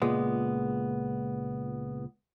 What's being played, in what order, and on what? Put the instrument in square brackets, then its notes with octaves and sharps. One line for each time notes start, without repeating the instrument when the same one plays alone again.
[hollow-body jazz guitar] C#2 A#2 G#3 B3